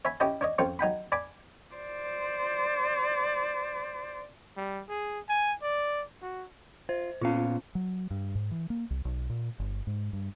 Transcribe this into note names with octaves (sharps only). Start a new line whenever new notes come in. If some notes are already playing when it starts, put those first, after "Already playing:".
C#5 E5 G#5 B5
C#4 E4 G4 D#5 A5
D4 C#5 D#5
F2 C#3 C4 F4 C#6
F#3 D#4 G5 B5
D5 G#5 A5 B5 D6
C5 D5
G3
G#4
G#5
D5
F#4
F4 C5
A#2 B3 C#4 F4 F5
F#3
G2
G#2
E3
A#3
C2
B1
A#2
G1
G#2
G2